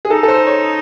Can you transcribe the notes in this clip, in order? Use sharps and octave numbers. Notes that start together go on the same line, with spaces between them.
G#4
D#4 A4
A4
C5
C#5